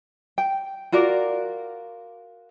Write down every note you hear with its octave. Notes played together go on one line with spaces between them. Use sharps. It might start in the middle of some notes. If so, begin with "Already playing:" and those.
G5
F4 F#4 A#4 D5